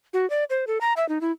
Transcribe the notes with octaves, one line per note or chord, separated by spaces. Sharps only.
F#4
D5
C5
A4
A#5
E5
D#4
E4